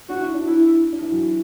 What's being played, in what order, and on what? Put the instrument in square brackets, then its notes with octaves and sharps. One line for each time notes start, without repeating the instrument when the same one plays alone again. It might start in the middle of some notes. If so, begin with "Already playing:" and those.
[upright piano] D4 [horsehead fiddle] F#4
[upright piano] E4
D4
[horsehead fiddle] E4
[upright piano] D4
E3 E4
F#3 F#4